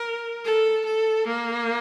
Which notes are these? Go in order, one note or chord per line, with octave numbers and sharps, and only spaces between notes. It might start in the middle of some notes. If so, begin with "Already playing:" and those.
Already playing: A#4
A4
A4
A#3